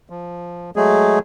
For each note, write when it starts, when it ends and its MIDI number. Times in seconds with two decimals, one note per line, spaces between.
0.10 0.71 53
0.76 1.19 54
0.76 1.19 56
0.76 1.19 57
0.76 1.19 68